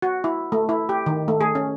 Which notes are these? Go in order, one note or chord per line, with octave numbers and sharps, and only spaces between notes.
F#4
E4
A3
E4
G4
D#3
A3
G#4
C#4